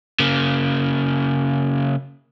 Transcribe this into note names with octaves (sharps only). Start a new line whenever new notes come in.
C#3 A#3